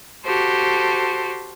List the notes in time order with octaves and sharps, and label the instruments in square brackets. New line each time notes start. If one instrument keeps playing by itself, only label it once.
[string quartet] F#4 G4 A4 C5